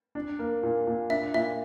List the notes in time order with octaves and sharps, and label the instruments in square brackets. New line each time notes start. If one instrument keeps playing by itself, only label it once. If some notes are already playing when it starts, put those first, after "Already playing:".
[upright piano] D4
A#3
A#2
A#2
[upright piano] D4 [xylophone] E5
[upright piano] A#2 [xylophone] E5